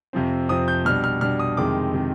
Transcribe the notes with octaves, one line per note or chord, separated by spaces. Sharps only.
F2 C3 F3 C4
F2 C3 F3 C4 D#6
G6
B2 G3 D4 F6
F6
B2 G3 D4 F6
D#6
F2 C3 D#3 G#3 D6
C3 D#3 G#3